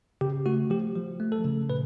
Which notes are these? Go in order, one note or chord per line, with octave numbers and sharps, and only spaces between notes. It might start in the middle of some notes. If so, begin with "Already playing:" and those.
C#3 G4
A3 F#4
F3 G4
F3
A3
A4
C#3
A#2 B4